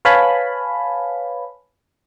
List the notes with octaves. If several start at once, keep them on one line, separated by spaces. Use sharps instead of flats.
B4 C#5 F5 G#5 A5 B5